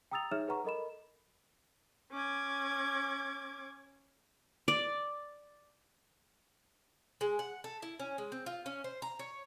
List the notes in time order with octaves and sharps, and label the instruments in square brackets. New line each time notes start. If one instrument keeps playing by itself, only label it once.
[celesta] G5 A#5 D#6 E6 A6 F7
D#4 G#4 C#5 E5 F6 E7
G#4 B4 F#5 A#5 C#6
A4 A#4 D#5 B5 E7
[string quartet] C#4 D6 G#6
[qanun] D5
[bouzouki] G#3
F#5
A4
E4
C#4
G#3
C4
F4
C#4
C5
A#5
C#5